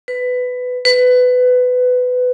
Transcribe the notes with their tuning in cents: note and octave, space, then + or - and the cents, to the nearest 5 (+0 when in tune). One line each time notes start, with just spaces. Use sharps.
B4 +15
B4 +20